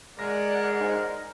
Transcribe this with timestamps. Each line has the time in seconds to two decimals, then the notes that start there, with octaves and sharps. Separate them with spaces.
0.19 G#3 A#4 D5 F#5 A#6
0.80 D#4 C5 G#5